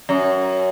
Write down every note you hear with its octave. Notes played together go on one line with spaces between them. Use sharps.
F#2